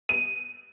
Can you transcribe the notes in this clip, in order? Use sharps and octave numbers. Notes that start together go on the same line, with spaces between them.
D#7